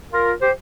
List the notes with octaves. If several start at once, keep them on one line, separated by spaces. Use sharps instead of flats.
F4 A#4
G4 C5